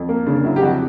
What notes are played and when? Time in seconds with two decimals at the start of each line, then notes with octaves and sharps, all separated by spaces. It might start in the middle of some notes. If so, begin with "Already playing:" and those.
Already playing: F2
0.09 A#3
0.26 C#3 D4
0.44 F#3 E4
0.56 G4
0.62 F2 F#4